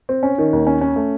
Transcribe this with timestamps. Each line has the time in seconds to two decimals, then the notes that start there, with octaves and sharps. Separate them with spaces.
0.09 C4
0.23 C#4
0.38 D#3
0.53 D#2
0.67 C#4
0.81 C#4
0.96 A3